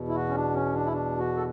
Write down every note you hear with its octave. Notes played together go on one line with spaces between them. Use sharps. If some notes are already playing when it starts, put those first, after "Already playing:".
Already playing: E2 B2
E4
F#4
C#4
D4
C#4
D4
E4
D4
F#4
A4